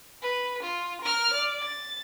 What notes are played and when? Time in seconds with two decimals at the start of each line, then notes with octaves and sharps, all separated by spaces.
0.22 B4
0.63 F4
1.02 A#4 F6
1.34 D5
1.63 A6